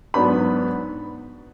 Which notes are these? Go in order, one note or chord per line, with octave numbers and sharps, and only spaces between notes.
G#2 F#3 B3 D4 B5